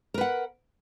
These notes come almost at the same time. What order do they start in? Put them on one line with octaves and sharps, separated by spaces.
A#4 B4 F#5